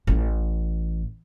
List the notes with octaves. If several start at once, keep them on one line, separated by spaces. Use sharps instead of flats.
A1